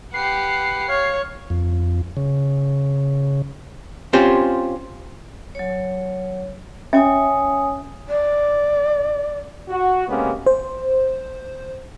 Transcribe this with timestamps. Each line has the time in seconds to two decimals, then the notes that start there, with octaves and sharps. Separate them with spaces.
0.14 G4 B4 F#5 C7
0.89 C#5 F5
1.50 F2
2.17 C#3
4.13 C4 C#4 F4 G4 C5
5.55 F#3 C#5
6.93 C#4 C#5 E5 G#5 D#6
8.09 D5
9.69 F#4
10.07 C3 G#3 A#3 B3 C#4
10.46 C5